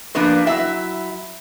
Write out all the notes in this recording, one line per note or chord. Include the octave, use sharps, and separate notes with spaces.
F3 A#3 B3 D4 B4
F#3 E4 E5